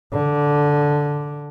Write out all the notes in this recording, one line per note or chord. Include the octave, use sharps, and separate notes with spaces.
D3